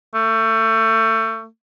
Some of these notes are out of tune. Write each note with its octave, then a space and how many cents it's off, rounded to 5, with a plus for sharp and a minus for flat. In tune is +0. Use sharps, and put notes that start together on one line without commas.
A3 +30